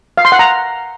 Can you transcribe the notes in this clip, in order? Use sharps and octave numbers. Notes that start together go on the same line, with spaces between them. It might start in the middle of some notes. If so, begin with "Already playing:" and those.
F5
C6
F#5
A#5